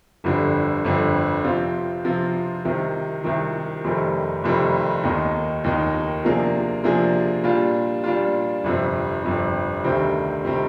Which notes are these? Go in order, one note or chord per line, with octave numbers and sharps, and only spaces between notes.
G1 F2 D3 G3
G1 F2 D3 G3
C3 F3 C4 F4
C3 F3 C4 F4
C2 C3 D#3
C2 C3 D#3
F1 F2 C3 D#3 G3
F1 F2 C3 D#3 G3
D#2 D#3 A#3 D#4
D#2 D#3 A#3 D#4
C3 F3 A#3 D4 G#4
C3 F3 A#3 D4 G#4
A#2 G3 D4 F4
A#2 G3 D4 F4
G1 F2 C3
G1 F2 C3
D2 C3 D#3 G3 C4
C3 D#3 G3 C4